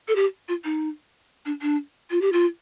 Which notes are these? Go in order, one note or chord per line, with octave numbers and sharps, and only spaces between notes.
A4
G4
F4
D#4
D4
D4
F4
G4
F4